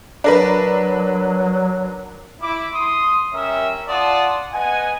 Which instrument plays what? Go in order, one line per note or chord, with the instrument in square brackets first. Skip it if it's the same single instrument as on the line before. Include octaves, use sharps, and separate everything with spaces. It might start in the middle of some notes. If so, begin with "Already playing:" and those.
[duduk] F#3 [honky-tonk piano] D4 A#4 B4
[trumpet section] E4 D6
C6 D#6
G3 C#4 A#4 E5
F4 D5 F#5 A5 C6 D#6
B3 D#5 F#5 G#5